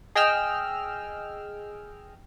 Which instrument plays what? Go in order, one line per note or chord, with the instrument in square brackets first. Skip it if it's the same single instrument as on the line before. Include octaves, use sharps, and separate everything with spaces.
[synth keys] G#4 D#5 G5 E6 F6